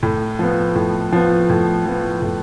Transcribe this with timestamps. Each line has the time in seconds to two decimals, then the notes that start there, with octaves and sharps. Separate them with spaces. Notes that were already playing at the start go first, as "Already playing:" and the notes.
0.03 A2
0.39 F3 B3
0.75 A2
1.12 F3 B3
1.50 A2
1.86 F3 B3
2.22 A2